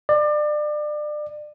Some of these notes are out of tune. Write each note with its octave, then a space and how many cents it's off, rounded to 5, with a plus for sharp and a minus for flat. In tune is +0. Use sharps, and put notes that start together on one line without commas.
D5 +30